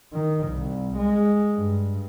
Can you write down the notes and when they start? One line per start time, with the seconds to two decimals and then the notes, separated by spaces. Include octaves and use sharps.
0.13 D#3
0.48 C2
0.98 G#3
1.55 G2